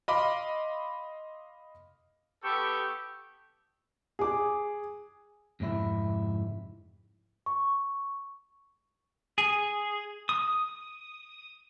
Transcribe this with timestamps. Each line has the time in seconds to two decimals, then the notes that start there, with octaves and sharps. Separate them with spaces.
0.08 D#5 F5 B5 C6 D6
2.43 B3 G4 A4 C#6
4.19 G#4 D6
5.60 F2 G#2 C3 E4
7.46 C#6
9.38 G#4
10.29 D#6